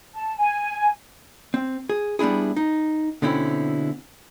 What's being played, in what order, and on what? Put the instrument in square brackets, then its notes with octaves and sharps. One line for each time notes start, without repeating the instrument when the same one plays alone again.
[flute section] A5
G#5
[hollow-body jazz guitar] C4
G#4
G3 B3 D4 E4 G#4
D#4
B2 D3 C4 C#4 E4